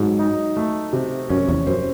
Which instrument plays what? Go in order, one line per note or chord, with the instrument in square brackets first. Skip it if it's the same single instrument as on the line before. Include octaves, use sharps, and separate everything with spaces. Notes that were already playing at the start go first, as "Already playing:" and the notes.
Already playing: [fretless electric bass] G#2 [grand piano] F#3
[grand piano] D#4
A3
C3
[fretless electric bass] F#2 [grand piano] C#4
[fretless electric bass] E2
[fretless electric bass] F#2 [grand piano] C5